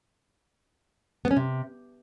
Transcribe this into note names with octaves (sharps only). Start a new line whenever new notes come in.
B3
C#4
C3